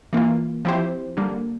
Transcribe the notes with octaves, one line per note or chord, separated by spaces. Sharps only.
E3 A#3 F4
F3 C4 E4 G4 C5
D3 G3 A#3